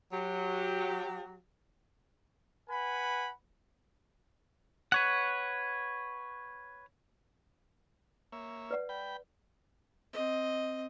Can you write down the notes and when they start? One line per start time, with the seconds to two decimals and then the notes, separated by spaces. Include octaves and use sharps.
0.13 F#3 G4
2.70 B4 F#5 G#5 B5
4.92 B4 C#5 F#5
8.32 A#3 C#5 E5
8.71 B4 D5 F#5
8.89 G5 B5
10.13 C4 D#5